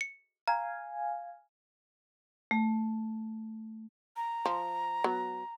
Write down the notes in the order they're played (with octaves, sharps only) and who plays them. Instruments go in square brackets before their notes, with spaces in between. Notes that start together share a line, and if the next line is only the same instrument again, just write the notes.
[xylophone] C#7
[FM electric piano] F5 G#5 [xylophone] A#5
[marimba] A3
[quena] A#5
[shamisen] F3
F#3 B3